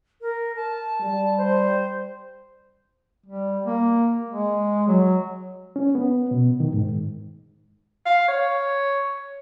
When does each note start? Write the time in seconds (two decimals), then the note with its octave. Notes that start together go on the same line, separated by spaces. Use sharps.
0.21 A#4
0.56 A5
1.01 G3
1.38 C5
3.26 G3
3.66 A#3
4.30 G#3
4.88 F#3
5.76 C#4
5.95 B3
6.31 B2
6.60 D#3
6.73 G#2
8.06 F5
8.28 C#5